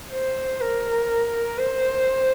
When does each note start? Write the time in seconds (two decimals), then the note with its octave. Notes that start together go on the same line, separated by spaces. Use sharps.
0.11 C5
0.60 A#4
1.58 C5